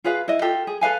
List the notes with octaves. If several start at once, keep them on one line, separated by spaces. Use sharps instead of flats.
F4 G#4 B4 F5
E4 D#5
F4 G4 A4
G#4
A4 B4 F5 G#5